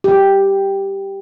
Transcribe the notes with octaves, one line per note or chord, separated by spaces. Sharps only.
G4